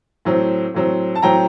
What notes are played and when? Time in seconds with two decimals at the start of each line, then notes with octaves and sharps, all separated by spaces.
0.25 A2 F#3 C4
0.74 A2 F#3 C4
1.15 A5
1.22 A2 F#3 C4 G5 A#5